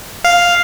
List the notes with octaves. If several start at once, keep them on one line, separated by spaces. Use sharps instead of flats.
F5